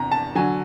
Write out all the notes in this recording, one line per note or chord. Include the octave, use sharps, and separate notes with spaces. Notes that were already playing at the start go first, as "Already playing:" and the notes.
Already playing: E2 C3 A#5
A5
D3 F#3 G#5